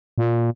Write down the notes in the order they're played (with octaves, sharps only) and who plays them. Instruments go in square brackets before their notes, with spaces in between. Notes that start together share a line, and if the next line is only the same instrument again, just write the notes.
[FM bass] A#2